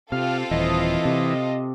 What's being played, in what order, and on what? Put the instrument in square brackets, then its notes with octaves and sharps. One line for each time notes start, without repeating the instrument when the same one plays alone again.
[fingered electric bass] C3 [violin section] C4 F4 A4 [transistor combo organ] F5
[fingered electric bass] D#1 [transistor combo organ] E3 [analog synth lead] D#5
[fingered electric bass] C3